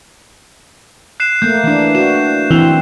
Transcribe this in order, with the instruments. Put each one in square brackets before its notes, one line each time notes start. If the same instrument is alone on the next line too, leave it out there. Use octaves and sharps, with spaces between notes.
[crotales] F#6 C7 E7
[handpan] A3 A#3 [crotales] G6
[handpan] E3 D4
[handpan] F#4 [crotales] E7
[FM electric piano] E3 [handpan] C4